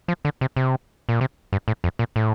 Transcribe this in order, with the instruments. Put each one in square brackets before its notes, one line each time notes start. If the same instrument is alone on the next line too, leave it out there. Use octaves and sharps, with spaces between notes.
[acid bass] F3
D3
C3
C3
A#2
C3
G2
A2
F2
A#2
A2